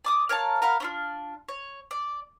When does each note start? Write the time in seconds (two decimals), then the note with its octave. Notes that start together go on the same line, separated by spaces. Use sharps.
0.05 D5 D6 D#6
0.29 A#4 C#5 F5 A5
0.62 A#4 F5 F#5 B5
0.80 C#4 D4 F4
1.49 C#5
1.91 D5